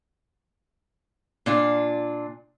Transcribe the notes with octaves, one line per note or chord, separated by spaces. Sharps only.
A#2 D4 F4